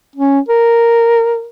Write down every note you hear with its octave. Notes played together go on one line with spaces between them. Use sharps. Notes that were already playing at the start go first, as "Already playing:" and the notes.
C#4
A#4